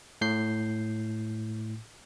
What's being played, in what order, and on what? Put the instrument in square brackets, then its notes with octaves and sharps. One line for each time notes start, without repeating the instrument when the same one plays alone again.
[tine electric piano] A2 G6 C7